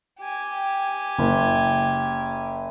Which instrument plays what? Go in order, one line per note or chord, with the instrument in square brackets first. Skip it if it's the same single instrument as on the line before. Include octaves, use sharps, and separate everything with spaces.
[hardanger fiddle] G4 G#5
[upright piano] F#1